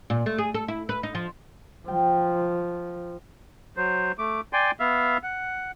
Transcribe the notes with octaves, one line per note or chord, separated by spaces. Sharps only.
A#2
A3
G#4
A4
E4
B4
D#4
F3
F3 G5
F#3 C5
A3 D6
D5 G5 G#5 C6
B3 E5 F5
F#5